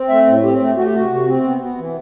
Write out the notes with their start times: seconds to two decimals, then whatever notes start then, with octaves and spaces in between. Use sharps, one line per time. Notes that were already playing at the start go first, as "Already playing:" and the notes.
Already playing: C4
0.09 A3 E5
0.27 A2
0.44 C4 G4
0.60 A3
0.76 A3 F#4
0.86 G4
0.94 C3 F#4
1.10 C3
1.27 C4
1.44 B3
1.61 B3
1.78 E3